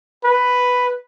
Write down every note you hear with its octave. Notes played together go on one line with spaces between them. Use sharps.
B4